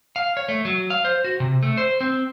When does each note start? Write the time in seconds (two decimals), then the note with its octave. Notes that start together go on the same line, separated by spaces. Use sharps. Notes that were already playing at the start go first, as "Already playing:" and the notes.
0.16 F5
0.37 C#5
0.49 A3
0.65 F#3
0.90 F5
1.05 C5
1.24 F#4
1.40 C3
1.63 A3
1.77 C5
2.01 C4